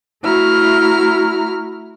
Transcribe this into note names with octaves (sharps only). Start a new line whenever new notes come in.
A3 E4 F#4 A#5 F6